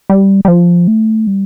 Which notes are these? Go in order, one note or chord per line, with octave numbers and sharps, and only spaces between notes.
G3
G3
F3
A3
G3